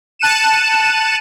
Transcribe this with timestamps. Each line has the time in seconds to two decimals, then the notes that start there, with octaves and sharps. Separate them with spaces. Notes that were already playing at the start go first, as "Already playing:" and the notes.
0.19 A5 F#6 C#7 D#7 E7